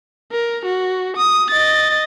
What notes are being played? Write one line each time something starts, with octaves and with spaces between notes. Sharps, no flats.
A#4
F#4
D#6
D#5 A6